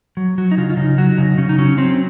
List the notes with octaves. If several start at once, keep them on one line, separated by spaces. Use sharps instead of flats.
F#3
F#3 F#4
D#4
C#3 F4
F4
C#3 D#4
F#3 F#4
C#3 D#4
C#3 C#4
D#4
F#3 C#4
F#3 C4